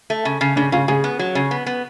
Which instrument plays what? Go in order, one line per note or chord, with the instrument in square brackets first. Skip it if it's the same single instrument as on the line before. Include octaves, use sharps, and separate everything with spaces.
[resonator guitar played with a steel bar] A3
C#3
C#3
[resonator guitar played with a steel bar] C#3 [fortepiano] D4
[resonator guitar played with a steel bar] C#3 [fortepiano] F4
[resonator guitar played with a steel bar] C#3 [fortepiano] G#4
[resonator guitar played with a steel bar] B3
F#3
C#3
B3
B3